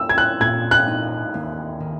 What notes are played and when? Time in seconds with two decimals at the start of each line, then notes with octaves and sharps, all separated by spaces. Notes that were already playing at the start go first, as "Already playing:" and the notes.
Already playing: A#3 E4 E6
0.09 G#6
0.18 F#6
0.40 A#2 G#6
0.71 F#6
0.87 D#4
1.34 D#2
1.80 D#3